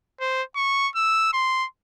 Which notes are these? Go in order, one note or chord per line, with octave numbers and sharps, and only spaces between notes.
C5
C#6
E6
C6